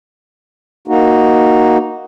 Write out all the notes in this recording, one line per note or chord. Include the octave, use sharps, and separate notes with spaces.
A#3 D#4 F#4